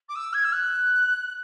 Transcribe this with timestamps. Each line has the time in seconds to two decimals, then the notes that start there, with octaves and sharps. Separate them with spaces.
0.08 D6
0.15 E6
0.33 G#6
0.44 E6
0.52 F#6